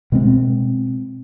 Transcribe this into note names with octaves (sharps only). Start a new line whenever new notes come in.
B2 G#3 C4